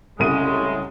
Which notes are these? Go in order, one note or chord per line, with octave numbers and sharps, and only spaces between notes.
C2 A2 C#3 F#3 G#3 D#7